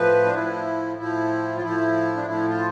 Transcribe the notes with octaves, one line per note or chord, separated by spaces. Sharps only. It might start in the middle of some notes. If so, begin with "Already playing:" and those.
Already playing: A2 F3 B4
D4
A2 F3 E4
A2 F3 E4
F4
A2 F3 E4
D4
A2 F3 E4
F4